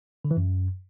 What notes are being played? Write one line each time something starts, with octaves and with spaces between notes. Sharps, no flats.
D3
E3
F#2